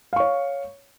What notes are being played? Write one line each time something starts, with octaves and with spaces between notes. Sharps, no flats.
C#5 F5 C#6